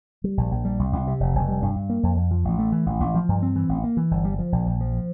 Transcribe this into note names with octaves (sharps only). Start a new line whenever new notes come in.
G3
A#1
A#1
G3
C2
C2
C3
F1
F1
G3
G2
G2
A#3
F2
F2
F3
A1
A3
E3
A1
A1
F3
G2
C4
E3
A1
A#3
E3
G1
G3
F3
A#1
A#1
F3